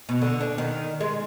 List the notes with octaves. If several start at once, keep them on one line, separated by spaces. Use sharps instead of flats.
B2
D3
D4
D#3
G#3